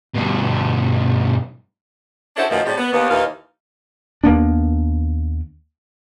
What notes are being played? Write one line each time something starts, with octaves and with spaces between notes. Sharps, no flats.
G2 B2
C#4 D4 E4 F#4 A4 C5
F#2 B2 D#3 F3 A3 E4
A2 C#3 G3 C4 G4
B3
D#2 A#3 B3
D#2 A#2 E3 D#4 F5
D#2 A#3 B3 D4